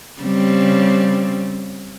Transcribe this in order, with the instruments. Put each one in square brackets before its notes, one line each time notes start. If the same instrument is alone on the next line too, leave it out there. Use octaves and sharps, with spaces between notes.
[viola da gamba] C#3 G3 C4